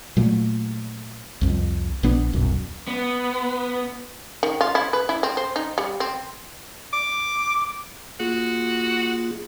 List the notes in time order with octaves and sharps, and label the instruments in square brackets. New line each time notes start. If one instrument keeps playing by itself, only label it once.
[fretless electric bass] A#2 F#3 A3
C2 F2
A#1 B3 D4
D#1 B1 F#2
[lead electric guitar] B3
[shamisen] D#3
F4
E4
B4
E4
C4
C5
D#4
G3
C4
[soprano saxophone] D6
[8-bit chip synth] A#3 F4 G#4 [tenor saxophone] F#4